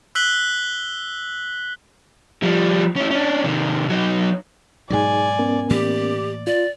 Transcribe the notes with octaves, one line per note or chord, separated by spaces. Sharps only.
E6 F#6 B6 F#7 G7
F3 G3
C#4 E4
C#4 D4
C3 D#3
F#3 D#4
G#2 B2 F#3 D#4 G#4 D5 G#5
B3 C#4 A#4
A2 E3 A#3 G4 D5
F4 D5